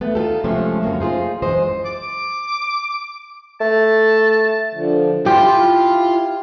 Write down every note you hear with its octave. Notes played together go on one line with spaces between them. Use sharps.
D2 A3 B3
D#4 F4 G4 A4
C3 F3 G#3 A3 C4 C#4
F#2 C#3 A#3 C#4
D#4 F4 G4 G#4 C5
F#2 E3 G#3 G#4 C5 D#5
D6
A3 A5
D3 F3
E4 F4 G4 C6